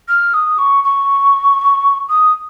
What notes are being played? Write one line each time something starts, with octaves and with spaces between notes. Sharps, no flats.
F6
D#6
C#6
C#6
D#6